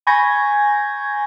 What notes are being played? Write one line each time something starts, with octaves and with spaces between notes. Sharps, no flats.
G#5 B5 C#6 G6 G#6 A#6